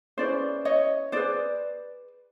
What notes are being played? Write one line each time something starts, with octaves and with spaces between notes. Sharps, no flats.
C#4 E4 G#4 B4 C5 D5
C#5 D#5
C#4 E4 G#4 B4 C5 D5